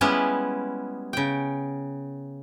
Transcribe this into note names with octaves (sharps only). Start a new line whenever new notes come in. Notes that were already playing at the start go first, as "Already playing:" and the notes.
G3 G#3 B3 C#4 E4 B4
C#3 G5